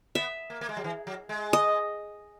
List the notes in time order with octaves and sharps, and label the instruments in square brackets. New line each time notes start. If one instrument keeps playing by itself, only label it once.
[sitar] B3 [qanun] E5
[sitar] A#3
A#3
G#3
F#3
E3
F#3
G#3
[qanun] D#5